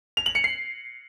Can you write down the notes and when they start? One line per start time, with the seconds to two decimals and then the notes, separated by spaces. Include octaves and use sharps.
0.17 F7
0.26 F#7
0.35 C#7
0.44 C7